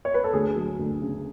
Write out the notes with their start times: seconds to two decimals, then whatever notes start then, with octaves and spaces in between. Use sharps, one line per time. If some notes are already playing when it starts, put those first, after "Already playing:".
0.05 C#5
0.14 B4
0.24 A4
0.33 D2 G#4
0.56 F#3
0.79 D2
1.02 C#3